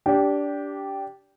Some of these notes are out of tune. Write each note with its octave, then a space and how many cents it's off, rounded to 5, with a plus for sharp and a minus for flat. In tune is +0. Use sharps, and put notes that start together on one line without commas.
D4 -20 G4 -5